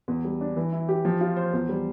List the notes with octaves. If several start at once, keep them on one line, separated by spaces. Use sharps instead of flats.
E2
G3
D4
E3
E4
G4
F3
F4
C5
E2
G3